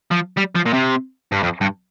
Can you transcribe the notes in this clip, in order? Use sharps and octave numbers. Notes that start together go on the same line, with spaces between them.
F3
G3
F3
A#2
C3
G2
F2
G2